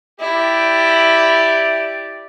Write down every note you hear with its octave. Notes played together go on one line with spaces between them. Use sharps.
E4 G4 D5